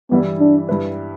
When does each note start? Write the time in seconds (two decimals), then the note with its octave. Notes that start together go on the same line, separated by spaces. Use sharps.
0.10 G2 E3 G3 B3 E4
0.40 D4
0.69 G2 G3 E4 B4